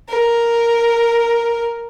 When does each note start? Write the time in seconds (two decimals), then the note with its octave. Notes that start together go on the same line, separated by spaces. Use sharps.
0.09 A#4